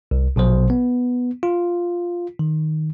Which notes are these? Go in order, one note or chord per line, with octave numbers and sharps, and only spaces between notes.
C2
A#1 B2 F#3 C5
B3
F4
D#3